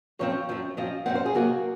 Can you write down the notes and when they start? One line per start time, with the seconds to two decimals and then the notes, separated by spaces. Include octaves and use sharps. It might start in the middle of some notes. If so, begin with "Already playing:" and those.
0.19 F#2 F3 C4 C#5
0.49 F#2 F3 C4
0.77 F#2 F3 C4 D#5
1.06 F#2 F3 C4 F#5
1.15 C5
1.26 G#4
1.35 C3 F#3 A#3 F#4